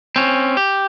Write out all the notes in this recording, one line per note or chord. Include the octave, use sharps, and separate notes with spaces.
C4 C#4
G4